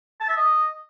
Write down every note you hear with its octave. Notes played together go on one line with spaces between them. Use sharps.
A5
E5
D#5